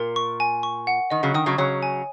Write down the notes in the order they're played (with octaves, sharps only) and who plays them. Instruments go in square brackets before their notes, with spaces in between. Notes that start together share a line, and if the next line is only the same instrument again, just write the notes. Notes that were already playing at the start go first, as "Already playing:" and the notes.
Already playing: [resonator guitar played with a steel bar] A#2 [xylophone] A#4
[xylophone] C#6
G#5
C#6
F#5
[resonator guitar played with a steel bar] D#3 [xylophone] D#5
[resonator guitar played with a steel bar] C#3 F#3
[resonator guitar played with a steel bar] D#3 [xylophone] D#6
[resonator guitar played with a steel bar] C#3 F#3
[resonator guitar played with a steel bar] C#3 F#3 [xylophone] C#5
[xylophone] G#5